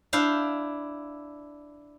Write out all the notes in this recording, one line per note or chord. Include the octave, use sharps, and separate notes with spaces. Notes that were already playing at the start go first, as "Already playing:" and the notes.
D4 E4 F5 G5